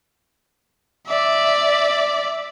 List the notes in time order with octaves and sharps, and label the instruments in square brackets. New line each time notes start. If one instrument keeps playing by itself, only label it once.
[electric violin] D5 E5